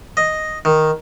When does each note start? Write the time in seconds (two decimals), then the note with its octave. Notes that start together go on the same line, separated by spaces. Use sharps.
0.17 D#5
0.65 D#3